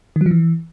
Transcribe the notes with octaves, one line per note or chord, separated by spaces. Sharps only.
D#3
F#3
F3
E3